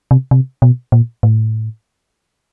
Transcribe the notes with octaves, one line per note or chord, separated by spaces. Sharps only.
C3
C3
B2
A#2
A2